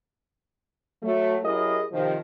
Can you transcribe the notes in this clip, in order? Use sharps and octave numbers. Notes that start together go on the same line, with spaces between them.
F#3 A3
F#2 E4 G4 G#4 A#4 D#5
C3 D#3 F3